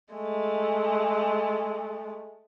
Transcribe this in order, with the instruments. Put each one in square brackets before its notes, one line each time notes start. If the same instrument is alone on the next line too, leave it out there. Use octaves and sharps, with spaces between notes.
[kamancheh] G#3 A3